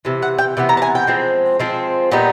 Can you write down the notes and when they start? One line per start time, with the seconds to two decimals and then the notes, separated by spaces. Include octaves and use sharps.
0.05 C3 E3
0.22 F#5
0.39 G5
0.57 C3 E3 B3
0.69 A#5
0.77 A5
0.82 G#5
0.95 G5
1.07 F3 G#3 C4
1.60 F3 G#3 C4
2.11 A#2 G3 B3 D#4